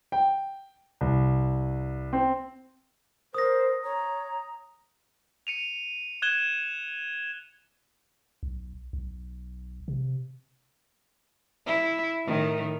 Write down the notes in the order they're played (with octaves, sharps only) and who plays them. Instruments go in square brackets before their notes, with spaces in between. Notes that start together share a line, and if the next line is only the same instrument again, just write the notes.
[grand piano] G5
C2
C4
[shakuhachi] A#4 [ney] C5 [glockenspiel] D#6 A#6
[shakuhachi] C#5 [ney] A#5
[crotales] C#7 D#7 F7
F#6 G#6 E7 G7
[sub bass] B1
B1
C3
[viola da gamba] E4
A2 D#3 A3